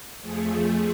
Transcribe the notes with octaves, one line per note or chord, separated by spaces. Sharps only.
F2 F3 A3 G#4